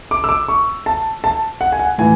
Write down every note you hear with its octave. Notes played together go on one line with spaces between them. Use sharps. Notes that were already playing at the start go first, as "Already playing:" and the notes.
D6
E6
D6
C#6
A5
A5
F#5
G#5
F#5
A2 E3 G#5